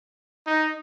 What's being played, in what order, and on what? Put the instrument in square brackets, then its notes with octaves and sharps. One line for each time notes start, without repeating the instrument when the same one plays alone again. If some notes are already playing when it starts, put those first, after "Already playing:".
[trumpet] D#4